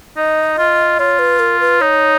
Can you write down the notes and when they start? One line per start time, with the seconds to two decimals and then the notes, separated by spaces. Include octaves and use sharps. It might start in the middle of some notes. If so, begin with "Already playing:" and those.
0.16 D#4 D#5
0.58 F4
0.99 F4 C#5
1.19 B4
1.39 A#4
1.60 B4
1.81 D#4 C#5